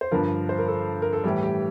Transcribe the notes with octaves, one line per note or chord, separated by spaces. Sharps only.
C5
G2 D3 F3 A#4
C5
A#4
A4
A#4
A4
A2 E3 G3 G4
G4